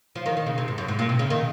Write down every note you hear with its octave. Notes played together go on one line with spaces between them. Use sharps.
F3
D#3
D#3
C#3
C3
G#2
F#2
G#2
A#2
C3
C#3
D#3